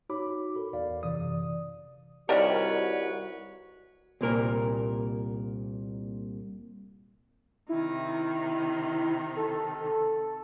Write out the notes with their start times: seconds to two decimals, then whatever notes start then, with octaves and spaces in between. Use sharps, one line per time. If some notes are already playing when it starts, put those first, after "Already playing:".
0.09 D#4 F#4 C#5 B5 D6
0.56 A4 A#4
0.73 E2 D5 F5
1.03 F#2 C3 E3 D5 D#6
2.29 C2 D#3 G3 F#4 A#4 B4 C#5
4.21 C2 A#2 A#4
7.69 C3 D#3 E4
9.37 A4